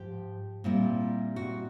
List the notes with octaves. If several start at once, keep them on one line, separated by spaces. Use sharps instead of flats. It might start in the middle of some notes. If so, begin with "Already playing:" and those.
Already playing: G#2 F3 G4
A#2 G3 C4 E4
F#4